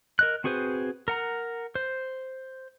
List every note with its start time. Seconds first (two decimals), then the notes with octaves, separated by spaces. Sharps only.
0.19 A#4 D#5 F#6
0.44 C4 F#4 G#4 B4 C5
1.08 A#4 F#5 A#5
1.75 C5